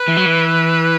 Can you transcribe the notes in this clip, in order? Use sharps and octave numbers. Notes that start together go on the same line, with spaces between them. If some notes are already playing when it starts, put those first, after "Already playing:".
Already playing: B4
E3
F#3
E3